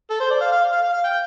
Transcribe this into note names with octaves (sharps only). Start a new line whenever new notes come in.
A4
C5
D5
F5
F5
F5
F5
F5
G5